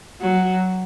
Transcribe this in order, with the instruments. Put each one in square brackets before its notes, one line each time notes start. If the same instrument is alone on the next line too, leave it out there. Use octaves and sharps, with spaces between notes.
[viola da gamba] F#3